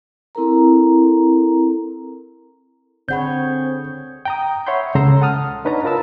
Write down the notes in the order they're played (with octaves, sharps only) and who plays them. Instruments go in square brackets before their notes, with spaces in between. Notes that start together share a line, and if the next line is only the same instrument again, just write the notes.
[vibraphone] C4 E4 A4 A#4 A#5
[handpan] D3 G#4 C#5 [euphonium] C4 [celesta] D5 F#5 B5 [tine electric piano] G6
[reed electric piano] G5 A#5 D#6
C#5 E5 F#5 B5 C6 G6
C#2 C#3 A4 A#5 C6 E6
F#5 A5 D#6 F6
D4 D#4 B4 C#5 A5 A#5
F4 A#4 B4 A5 E6